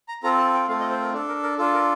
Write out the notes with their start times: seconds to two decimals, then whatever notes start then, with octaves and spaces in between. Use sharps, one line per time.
0.09 A#5
0.23 C4 F4 A4 A#5
0.38 A5
0.54 G5
0.68 A3 C4 F4 A4 F5
0.80 D#5
0.91 C5
1.02 A#4
1.13 D4 A4
1.28 A#4
1.43 A#4
1.58 D4 F4 A4
1.74 A#4